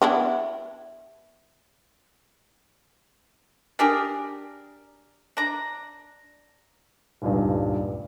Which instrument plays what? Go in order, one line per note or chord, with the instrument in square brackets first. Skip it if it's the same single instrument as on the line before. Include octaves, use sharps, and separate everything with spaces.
[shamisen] B3 D4 E4
[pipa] D4 G4 G#4 A#4
D4 A#5
[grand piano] D#1 C#2 G2